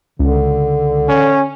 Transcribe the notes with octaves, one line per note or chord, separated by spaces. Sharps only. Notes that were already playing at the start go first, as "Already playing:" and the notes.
C#2 D3
C#4